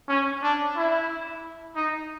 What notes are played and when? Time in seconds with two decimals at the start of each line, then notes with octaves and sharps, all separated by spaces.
0.09 C#4
0.43 D4
0.77 E4
1.76 D#4